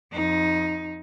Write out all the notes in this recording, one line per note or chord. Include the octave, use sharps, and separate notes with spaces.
F2 D#4